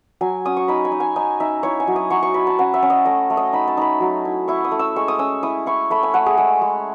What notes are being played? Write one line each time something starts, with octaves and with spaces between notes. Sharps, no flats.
F#3 G#5
C#4 D#6
C#6
D#4 B5
G#5
D#4
G#5
D#4 G#5
D#4 E5
E4 C#5
G#5
F#3
D#6
F#3 C#6
C#6
E4 B5
A5
C#4 F#5
E5
C#4
D#5
A3 D#5
A3
D#5
D#4 B5
A5
D#4 B5
F#3
E4
E4 C#6
D#6
A3
E6
G#3 C#6
D#6
C#4 E6
E4 D#6
E4 C#6
A3 B5
G#5
A3 F#5
G#4
G#3 G#4
G#3